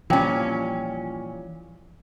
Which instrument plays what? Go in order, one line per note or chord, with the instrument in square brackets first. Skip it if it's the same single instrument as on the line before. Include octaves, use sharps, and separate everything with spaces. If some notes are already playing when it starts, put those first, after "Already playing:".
[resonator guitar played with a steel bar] A#2 C#4 [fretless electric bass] E3 F3 G3 [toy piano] F4 G5 A5